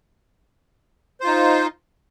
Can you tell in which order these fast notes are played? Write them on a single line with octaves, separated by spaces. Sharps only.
C5 F4 D#4